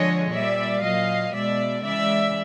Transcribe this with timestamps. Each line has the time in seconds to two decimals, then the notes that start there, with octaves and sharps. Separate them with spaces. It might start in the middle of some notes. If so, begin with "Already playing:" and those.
Already playing: D3 F3 G#3 C#5 D#5
0.32 A#2 G3 D5 E5
0.83 A#2 F#3 D#5 F5
1.33 B2 G#3 D5 E5
1.84 C#3 E3 G#3 D5 E5